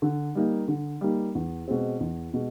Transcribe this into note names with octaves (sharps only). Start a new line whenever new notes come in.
D3
G3 A#3 D#4
D3
G3 A#3 D#4
E2
B2 G#3 C4
E2
B2 G#3